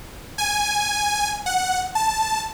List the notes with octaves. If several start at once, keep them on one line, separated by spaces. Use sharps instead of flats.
G#5
F#5
A5